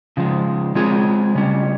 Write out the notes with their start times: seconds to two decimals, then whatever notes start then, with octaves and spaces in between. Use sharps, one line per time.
0.17 C#3 F3 G#3
0.75 G#3 C4 F4 G#4
1.35 C#3 G3 C#4